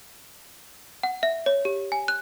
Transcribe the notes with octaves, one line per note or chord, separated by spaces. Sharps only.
F#5
E5
C#5
G4
G#5
F#6